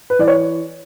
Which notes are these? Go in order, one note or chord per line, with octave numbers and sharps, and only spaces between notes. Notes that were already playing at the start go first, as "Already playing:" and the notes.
B4
E3 D5
C#5